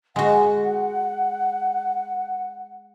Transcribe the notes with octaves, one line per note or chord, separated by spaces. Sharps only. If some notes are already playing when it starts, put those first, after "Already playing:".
G#3 F#4 F#5